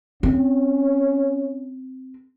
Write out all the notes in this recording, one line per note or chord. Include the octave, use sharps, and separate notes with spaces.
C4 C#4